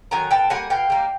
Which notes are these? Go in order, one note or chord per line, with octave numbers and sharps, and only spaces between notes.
D#3 F#3 G#5 A#5
B2 G5 A5
G3 A#3 F#5 G#5
B2 F5 G5
G3 A#3